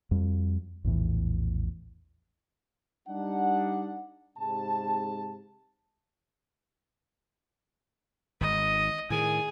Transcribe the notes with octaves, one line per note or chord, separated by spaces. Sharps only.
F2 G3
A#1 E2 A2 E3
G3 D4 D#4 F#5
G#2 C3 A5
G#1 D#5
A2 D#3 G#4 G#5